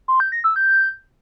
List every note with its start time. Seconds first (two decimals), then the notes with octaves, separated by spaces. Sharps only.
0.08 C6
0.20 G6
0.32 A#6
0.44 E6
0.56 G6